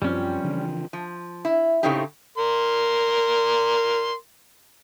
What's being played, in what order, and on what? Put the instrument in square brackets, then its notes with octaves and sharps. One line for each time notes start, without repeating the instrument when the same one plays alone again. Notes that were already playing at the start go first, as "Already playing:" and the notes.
[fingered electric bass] F#2 [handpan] F3 C4 [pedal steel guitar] G3 C#4
[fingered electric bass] C#3 E3 D4
[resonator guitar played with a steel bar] F3
E4
A2 C#3 A3 C4 D#4 G4
[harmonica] A#4 C6